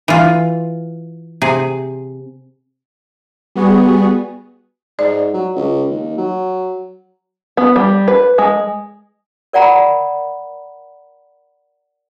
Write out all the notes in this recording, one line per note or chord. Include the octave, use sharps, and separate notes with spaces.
E3 F4
C3 G#4
G3 B3 F#4 G#4
G#2 D5
F#3
C#2
D#2
F#3
B3
G3
B4
G#3
A#4 D5 F#5 A#5 B5